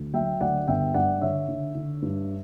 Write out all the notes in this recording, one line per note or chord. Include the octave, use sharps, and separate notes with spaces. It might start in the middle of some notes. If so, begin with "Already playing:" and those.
Already playing: D2
F#3 E5 G5
D2 D5 F#5
G1 E5 G5
G2 D5 F#5
D3 C#5 E5
D3
D3
G2